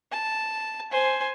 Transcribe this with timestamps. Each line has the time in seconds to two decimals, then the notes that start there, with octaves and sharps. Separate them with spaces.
0.11 A5
0.91 C5 G#5